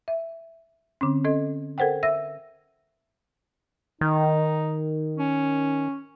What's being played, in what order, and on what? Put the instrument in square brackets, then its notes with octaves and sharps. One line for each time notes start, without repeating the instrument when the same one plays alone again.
[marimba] E5
D3 C4 C#4
C#4 A4 D#5
A4 A#4 C5 F#5 G5
E5 E6 A#6
[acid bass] D#3 [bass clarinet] D#4
[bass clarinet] C#4